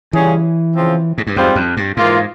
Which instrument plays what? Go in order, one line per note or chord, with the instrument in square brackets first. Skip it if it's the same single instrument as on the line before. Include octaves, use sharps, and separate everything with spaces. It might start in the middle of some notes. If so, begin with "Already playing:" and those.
[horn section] C#3 G3 C#4 F4 G#4 [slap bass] E3
[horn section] C#3 F3 C4
[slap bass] G#2
G2
[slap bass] F2 [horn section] G#2 G3 C4 F4
[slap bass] F2
G2
[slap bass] G#2 [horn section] E3 A#3 F4